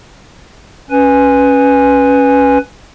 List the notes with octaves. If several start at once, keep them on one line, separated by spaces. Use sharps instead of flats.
C#4 B4 G#5